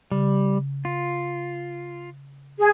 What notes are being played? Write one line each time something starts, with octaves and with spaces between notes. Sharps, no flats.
C#3 G3
F4
G#4